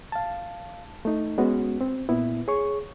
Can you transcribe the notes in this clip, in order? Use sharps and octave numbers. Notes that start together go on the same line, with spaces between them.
F5 A5
A3 D#4
G#3 B3 C#4 F#4
C4
A#2 B3 E4
G#4 C#5 C#6